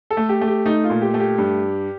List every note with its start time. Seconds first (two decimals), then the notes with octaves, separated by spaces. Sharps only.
0.11 A4
0.17 A3
0.29 G4
0.41 A3
0.47 G4
0.65 A3 D#4
0.84 F4
0.90 A#2
1.02 G4
1.14 A3
1.20 G4
1.38 G2